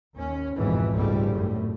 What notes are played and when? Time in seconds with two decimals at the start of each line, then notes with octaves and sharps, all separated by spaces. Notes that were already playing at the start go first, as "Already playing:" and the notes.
0.16 D#2 C#4
0.57 G#1 F2 G#2 B2 E3
0.94 G#1 C#2 A#2 G3 A3
1.32 F#2 A2